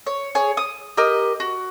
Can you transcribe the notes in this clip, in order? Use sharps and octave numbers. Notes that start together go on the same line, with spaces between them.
C#5
G#4 C#5
D#6
G4 A#4 D#5
F#4